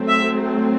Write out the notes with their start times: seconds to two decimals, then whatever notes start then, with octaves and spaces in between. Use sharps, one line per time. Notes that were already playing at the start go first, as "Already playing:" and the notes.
Already playing: F#3 A3 C4
0.08 E5